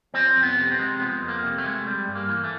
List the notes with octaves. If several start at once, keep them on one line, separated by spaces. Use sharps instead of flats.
F3 C4
F2
B3
C3
C4
G#3
F3 B3
F2
A#3
C3
A3
G#3
G3
G2
A#3
E3
A3